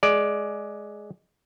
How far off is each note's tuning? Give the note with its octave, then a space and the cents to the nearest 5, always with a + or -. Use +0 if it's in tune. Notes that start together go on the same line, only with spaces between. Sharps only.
G#3 +15 D5 +0